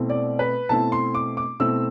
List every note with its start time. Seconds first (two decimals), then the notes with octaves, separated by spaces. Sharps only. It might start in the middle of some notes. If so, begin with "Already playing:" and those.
Already playing: B2 A3 C4 E4
0.10 D5
0.39 B4
0.69 B2 A3 C4 E4 A5
0.92 C6
1.15 D6
1.37 D6
1.60 B2 A3 C4 E4 E6